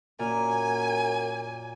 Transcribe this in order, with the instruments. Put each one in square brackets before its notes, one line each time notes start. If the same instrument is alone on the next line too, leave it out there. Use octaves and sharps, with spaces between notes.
[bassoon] F#2 [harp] A#2 [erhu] G#5